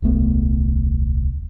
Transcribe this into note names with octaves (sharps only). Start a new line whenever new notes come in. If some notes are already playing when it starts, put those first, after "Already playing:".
D#1 C2 A3 B3